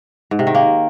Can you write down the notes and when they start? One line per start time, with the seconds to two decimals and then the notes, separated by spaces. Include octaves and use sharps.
0.31 G#2
0.39 C3
0.47 D#3
0.55 A#3